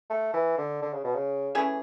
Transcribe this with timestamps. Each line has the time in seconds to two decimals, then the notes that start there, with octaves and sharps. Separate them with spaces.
0.10 A3
0.34 E3
0.58 D3
0.82 D3
0.93 C#3
1.04 B2
1.15 C#3
1.55 E3 A3 C#4 G#4